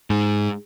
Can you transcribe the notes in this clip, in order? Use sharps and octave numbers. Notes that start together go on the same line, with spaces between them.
G#2